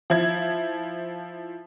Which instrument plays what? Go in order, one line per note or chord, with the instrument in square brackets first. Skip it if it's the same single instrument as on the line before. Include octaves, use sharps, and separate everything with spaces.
[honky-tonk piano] F3 E4 G#6